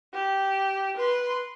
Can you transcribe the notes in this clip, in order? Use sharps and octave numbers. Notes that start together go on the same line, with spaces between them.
G4
B4 C6